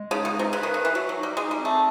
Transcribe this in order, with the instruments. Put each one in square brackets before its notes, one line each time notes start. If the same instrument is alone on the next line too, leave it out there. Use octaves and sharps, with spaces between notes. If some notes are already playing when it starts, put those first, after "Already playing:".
Already playing: [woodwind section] G#3
[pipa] C#3 [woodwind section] D#4
[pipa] B2
[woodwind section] D#4
[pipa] C3
[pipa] C#3 [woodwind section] B4
[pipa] D#3
[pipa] D#3 [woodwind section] B4
[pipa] E3
[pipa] F#3 [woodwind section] F#4
[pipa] F#3
[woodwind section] D#4
[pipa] G3
[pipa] G#3 [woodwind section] D#4
[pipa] G3
[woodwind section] C4
[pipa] A3